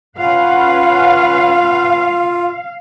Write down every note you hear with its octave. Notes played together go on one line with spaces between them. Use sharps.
C#4 F4 B4 F5 F#5